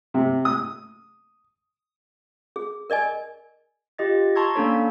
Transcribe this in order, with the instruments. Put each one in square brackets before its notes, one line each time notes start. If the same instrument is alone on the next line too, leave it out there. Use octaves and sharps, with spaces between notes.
[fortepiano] C3
D#6
[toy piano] G#4
A#4 D5 D#5 G#5
[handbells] F4 G4 D#5 A6
A5 A#5 C6 C#6 E6 G#6
A#3 C#4 D4 A4 C#5